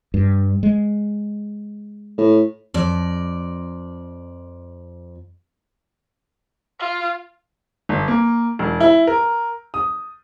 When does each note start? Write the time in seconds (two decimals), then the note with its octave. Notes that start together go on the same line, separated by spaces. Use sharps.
0.14 G2
0.63 G#3
2.18 A2
2.74 F2 D5
6.80 F4
7.89 G1
8.08 A#3
8.59 E1
8.81 E4
9.07 A#4
9.74 D#6